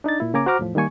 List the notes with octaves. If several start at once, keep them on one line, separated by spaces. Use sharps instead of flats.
D4 D#4 D5 A6
A#2 E4
C#3 A#3 C#4 G#5 A#5 D6
F#4 C5 A#5 D6 F6
E2 A2 F3
D#3 G3 A#3 G#5 C#6